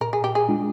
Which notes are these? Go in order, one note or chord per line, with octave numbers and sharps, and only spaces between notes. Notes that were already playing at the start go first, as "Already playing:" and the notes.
A#2 A#4
G#4
G4
G#4
G#3 D4 F4